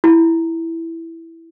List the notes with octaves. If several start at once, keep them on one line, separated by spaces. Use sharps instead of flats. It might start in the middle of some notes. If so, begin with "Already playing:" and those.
E4